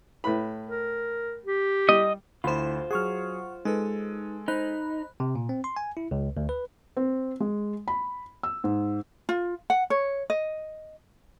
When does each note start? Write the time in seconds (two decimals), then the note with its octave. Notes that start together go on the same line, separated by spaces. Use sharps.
0.24 A2 B4 B5
0.69 A#4
1.45 G4
1.89 G3 D#5
2.44 D2 E4 F4 C5 B5
2.91 F#3 G#4 F#5 C#6 F6
3.65 G#3 D#4 A4 B4
4.48 D#4 C5 B5 F#6
5.20 C3
5.36 A#2
5.49 C4
5.64 C6
5.76 G#5
5.97 E4
6.11 C#2
6.37 D2
6.49 B4
6.97 C4
7.40 G#3
7.88 B5
8.43 E6
8.64 G#2
9.29 F4
9.70 F#5
9.90 C#5
10.30 D#5